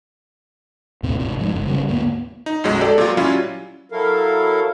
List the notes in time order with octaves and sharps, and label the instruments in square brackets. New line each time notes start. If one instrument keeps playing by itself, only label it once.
[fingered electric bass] D#2 A2 C3 C4
G#1 C3
F2 G#2
F#1
C#3 G3
D2 G#2 A#3 B3
[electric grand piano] D#4
B1 F#2 F#3 G#3
G4 A4 D5
A#2 F#3 F4
F#3 G3 C#4 E4 F4
[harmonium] F#3 E4 A4 A#4 F5